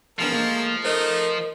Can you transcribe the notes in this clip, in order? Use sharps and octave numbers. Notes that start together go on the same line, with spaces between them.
E3 F3 B3 D4 G#4 A#4
G#2 A3 A#3
A3 D#4 A#4 C5 D#5